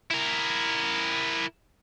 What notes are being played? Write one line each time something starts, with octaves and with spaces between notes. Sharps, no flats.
E4 A#4